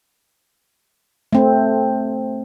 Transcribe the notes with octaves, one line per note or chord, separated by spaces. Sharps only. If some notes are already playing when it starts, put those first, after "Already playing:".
A3 C4